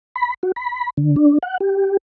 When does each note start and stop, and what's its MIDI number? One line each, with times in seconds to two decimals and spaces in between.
0.16 0.34 83
0.43 0.52 66
0.56 0.90 83
0.97 1.16 50
1.16 1.38 62
1.43 1.58 78
1.60 1.97 67